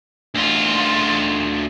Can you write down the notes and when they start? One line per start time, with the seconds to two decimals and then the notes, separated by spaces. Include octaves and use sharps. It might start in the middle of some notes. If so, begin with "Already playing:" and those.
0.34 D2 F4